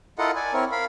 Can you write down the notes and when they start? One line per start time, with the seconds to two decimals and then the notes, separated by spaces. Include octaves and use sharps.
0.19 E4 F4 A4 A#4 D#5 F#5
0.36 D5 G#5
0.53 C4 E4 A#4 C#5
0.72 A#4 F5 B5